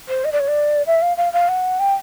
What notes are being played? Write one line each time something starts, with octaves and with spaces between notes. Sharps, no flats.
C5
D#5
D5
C#5
D5
E5
F5
F5
F5
F#5
G5